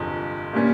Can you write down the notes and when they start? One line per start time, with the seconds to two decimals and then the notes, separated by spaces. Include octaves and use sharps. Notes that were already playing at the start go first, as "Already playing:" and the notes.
Already playing: G1 F2 C3 F3 G#3
0.53 A#2 G3 A#3 C#4